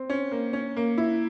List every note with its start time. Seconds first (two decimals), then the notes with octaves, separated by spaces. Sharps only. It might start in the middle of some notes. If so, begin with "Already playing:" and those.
Already playing: C4
0.10 C#4
0.31 A#3
0.53 C#4
0.76 A#3
0.98 E4